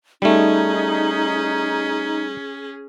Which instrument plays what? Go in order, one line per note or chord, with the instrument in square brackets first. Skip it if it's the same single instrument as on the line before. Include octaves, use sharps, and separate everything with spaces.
[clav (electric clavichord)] G3 A3 [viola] C#4 G#4 [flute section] D#4